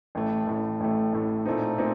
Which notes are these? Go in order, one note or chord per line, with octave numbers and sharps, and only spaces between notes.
A1 A2 A3
A1 A2 A3
A1 A2 A3
A1 A2 A3
A#2 A3 C4 D#4
A#2 A3 C4 D#4